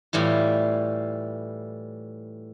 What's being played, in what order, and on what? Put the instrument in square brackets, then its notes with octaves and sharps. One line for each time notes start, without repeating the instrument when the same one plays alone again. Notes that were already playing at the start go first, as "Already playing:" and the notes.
[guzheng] A2 E3 G3 F4